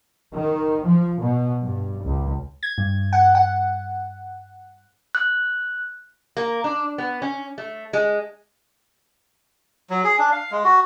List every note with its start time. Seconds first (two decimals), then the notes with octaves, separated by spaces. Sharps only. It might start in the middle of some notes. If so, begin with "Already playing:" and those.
0.33 D#3
0.86 F3
1.19 B2
1.63 G2
2.04 C#2
2.63 G#6
2.78 G2
3.13 F#5
3.35 F#5
5.15 F#6
6.37 A#3
6.64 D4
6.98 B3
7.22 C#4
7.58 A3
7.93 G#3
9.90 F#3
10.04 G#4
10.19 D4
10.32 F5
10.51 G#3
10.64 F#4